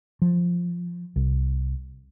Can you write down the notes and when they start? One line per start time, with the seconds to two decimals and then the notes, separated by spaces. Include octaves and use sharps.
0.22 F3
1.16 C2